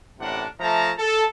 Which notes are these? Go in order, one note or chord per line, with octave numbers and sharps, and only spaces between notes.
A1 A2 C3 D4 A#4 F#5
F3 A3 E5 A5 A#5
A4